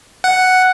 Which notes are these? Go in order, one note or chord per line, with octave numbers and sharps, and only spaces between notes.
F#5